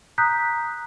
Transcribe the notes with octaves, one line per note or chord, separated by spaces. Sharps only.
A#5 D#6 F#6 G6 B6